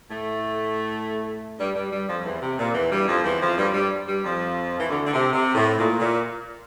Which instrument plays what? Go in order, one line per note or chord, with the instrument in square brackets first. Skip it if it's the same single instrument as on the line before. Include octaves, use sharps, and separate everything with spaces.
[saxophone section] A2 A3
G2 G3
G2 G3
G2 G3
F2 F3
E2 E3
C3
A#2
E2 E3
G2 G3
F2 F3
E2 E3
F2 F3
G2 G3
G2 G3
G2 G3
F2 F3
E3
D2 D3
D3
C3
C3
A2
A#2
A#2